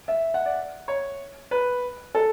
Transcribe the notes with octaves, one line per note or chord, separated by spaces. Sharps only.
E5
F#5
D5
C#5
B4
A4